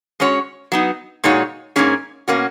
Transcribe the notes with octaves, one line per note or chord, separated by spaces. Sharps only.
G#3 C#4 F#4 C#5
F#3 B3 D#4
A#2 G#3 D#4 F#4 C#5
G#2 D#3 A#3 C#4 G#4
B2 A#3 C#4 F#4